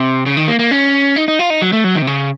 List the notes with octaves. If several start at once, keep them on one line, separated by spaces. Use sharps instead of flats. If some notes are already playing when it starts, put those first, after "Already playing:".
Already playing: C3
C#3
D#3
A#3
A#3
C#4
D#4
D#4
F4
D#4
F#3
A3
F#3
D#3
C3
C#3